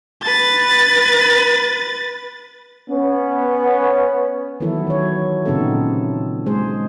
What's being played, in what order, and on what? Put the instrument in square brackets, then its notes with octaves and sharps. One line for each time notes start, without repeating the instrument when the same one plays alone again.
[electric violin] B4 A6
[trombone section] B3 C#4
[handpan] D#3 E3 F#3 B3 E4 A4
F#3 C#5
A#2 C#3 B3 C4 D#4 A4
G#3 G#4 C5